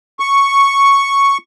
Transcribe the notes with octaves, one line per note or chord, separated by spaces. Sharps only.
C#6